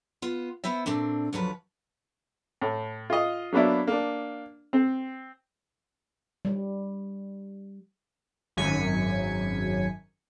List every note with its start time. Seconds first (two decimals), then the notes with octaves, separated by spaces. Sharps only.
0.22 B3 F4
0.64 B3 E4 C5 E5
0.86 A#2 A3 C4 D4
1.33 D2 F3 F#3 B4
2.62 A2
3.10 F4 D#5
3.52 F#3 A#3 B3 D4 E4
3.87 A#3 D4
4.73 C4
6.45 G3
8.57 G#1 F#2 G#5 B6 C#7